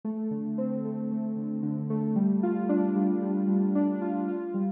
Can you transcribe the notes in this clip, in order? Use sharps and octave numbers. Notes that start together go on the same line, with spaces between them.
A3
D3
C4
A3
A3
D3
D3
A3
G3
F4
D4
G3
G3
G3
D4
F4
F4
G3